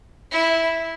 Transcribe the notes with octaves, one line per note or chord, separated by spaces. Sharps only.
E4